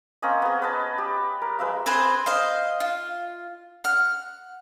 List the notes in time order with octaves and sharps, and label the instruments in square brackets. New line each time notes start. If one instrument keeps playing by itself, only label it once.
[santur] A#3 C4 C#4 D#5
B3 G#4
B4 C#5 D#5 A5
G4
A#4
G#3 B4 E5 F5
[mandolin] C4 G#4 B4 C5
C5 D#5 F5
F4
F#5 F6